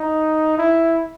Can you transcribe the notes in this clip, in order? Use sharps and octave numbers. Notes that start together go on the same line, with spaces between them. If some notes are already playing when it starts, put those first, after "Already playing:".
Already playing: D#4
E4